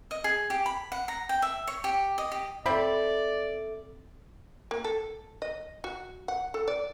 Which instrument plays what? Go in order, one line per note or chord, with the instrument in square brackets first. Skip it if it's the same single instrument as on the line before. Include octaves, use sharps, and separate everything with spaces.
[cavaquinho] D#5
G#4
G4
B5
F#5
A#5
G5
E5
C#5
G4
D#5
G4
[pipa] C4 B5 [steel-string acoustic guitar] A4 E5 [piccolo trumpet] D5
[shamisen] A#3
A4
D#5
F#4
F#5
A4
D5